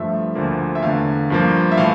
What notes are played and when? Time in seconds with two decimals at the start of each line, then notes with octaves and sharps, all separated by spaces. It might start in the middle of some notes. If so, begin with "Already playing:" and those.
Already playing: G2 F3 A3 E5
0.35 D2 D3 F3 A#3
0.75 E5
0.83 E2 D3 A3 F5
1.30 G2 F3 A#3
1.72 E5
1.77 A2 E3 A3 F5